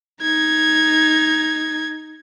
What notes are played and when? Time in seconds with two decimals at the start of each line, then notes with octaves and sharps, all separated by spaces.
0.22 D#4 G#6